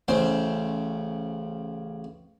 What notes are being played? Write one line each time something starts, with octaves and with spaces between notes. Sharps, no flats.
A1 C#3 C5 C6